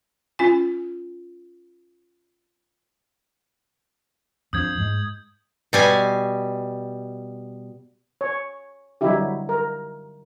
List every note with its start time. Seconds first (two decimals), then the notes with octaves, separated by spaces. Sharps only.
0.39 C#4 F4 G#5
4.53 F2 F3 D4 D#6 G6 G#6
4.78 G#2 G#3
5.73 B2 G3 G#5
8.21 C#5
9.01 D3 F#3 G3 D#4 E4 G4
9.49 A#4